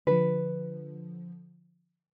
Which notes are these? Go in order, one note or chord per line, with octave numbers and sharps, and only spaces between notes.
D3 F3 B4